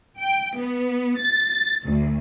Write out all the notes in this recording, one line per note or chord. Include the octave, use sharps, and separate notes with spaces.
G5
B3
A6
D2